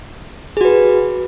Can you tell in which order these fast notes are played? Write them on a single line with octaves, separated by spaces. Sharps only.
G#4 F#4 B4